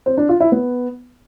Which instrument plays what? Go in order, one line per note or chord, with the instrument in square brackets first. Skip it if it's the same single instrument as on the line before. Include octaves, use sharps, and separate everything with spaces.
[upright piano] C4
D4
F4
E4
B3